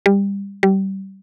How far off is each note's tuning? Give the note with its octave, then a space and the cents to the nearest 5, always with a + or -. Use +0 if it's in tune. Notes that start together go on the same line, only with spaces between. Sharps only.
G3 +20
G3 -25